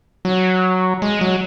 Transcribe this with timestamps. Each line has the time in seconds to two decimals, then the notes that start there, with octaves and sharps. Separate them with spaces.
0.25 F#3
1.02 G#3
1.21 F#3